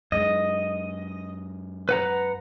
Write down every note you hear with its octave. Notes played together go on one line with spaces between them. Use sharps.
F#2 G#3 D#5
B4 F#5 A#5